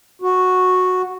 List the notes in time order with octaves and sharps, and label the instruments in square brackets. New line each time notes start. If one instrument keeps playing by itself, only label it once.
[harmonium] F#4